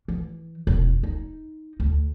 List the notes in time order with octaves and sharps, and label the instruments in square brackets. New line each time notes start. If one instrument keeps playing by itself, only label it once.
[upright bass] E3
E1
D#4
D2